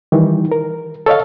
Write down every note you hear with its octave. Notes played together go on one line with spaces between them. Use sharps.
D#3 E3 G3
A#4
A4 C#5 D#5 F5